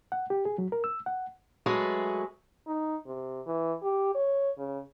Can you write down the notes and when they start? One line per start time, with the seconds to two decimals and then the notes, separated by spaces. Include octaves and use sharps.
0.12 F#5
0.30 G4
0.45 G#4
0.58 F#3
0.72 A#4
0.84 E6
1.06 F#5
1.66 F#3 G#3 A3 G#4 B4
2.67 D#4
3.06 C3
3.46 E3
3.82 G4
4.15 C#5
4.58 C#3